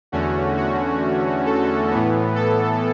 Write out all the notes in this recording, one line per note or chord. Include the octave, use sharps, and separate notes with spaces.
E2 D3 A3 C#4 F#4
F#4
A4
A2 E3 B3
A4